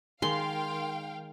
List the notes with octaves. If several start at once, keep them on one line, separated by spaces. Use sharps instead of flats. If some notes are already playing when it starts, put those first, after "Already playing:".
D#3 G#3 F5 G5 C6